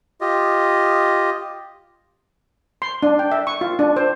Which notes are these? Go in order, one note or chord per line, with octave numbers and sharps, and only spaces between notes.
F4 G4 D#5
C6
D4
G5
E5
C#6
F4
D4
C5